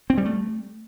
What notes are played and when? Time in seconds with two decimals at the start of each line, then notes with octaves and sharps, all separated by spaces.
0.10 C4
0.18 G3
0.25 A3